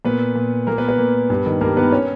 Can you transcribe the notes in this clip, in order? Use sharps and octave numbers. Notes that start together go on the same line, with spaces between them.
A#2 B3 B4
A#2
A#2 A#3 A#4
B3 B4
B3 B4
A#2
G2
D#3
G2 A#3 A#4
D#3 B3 B4
C#4 C#5